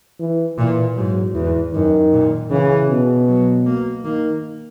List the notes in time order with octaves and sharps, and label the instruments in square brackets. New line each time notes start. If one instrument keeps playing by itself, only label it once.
[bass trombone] E3
[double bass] A#2 [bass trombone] E3
[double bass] G#2 [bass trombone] F#3
[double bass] E2 [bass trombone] E3
[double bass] F#2 [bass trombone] D#3
[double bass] A#2
[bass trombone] C#3 [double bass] E3
[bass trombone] B2
[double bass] F#3
A#3
[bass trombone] D#3 [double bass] A#3